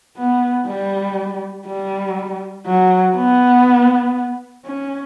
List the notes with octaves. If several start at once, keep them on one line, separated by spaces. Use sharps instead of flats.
B3
G3
G3
F#3
B3
C#4